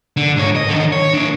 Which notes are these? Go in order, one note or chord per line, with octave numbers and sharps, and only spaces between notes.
D3
G#2 C#5
D#5
D3 D#3
C#5
A2 D4